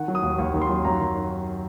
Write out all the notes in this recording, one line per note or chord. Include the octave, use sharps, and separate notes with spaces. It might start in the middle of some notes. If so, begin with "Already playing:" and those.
Already playing: D#3 F#5
F#3
D#6
D#2
D#2
D#3
C6
F#3
F#2 A#5
D#3